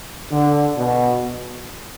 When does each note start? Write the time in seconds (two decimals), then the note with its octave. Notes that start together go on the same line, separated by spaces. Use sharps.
0.31 D3
0.78 B2